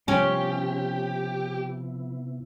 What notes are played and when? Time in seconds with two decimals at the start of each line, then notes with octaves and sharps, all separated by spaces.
0.08 C3 F3 B3 C#4 E4 G4